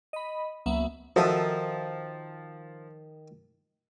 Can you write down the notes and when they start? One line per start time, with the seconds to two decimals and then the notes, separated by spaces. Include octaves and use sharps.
0.13 D#5 B5
0.66 C#2 F#3 A#3 B3 E5
1.16 D#3 F3 F#4 A4 A#4 E5 D#6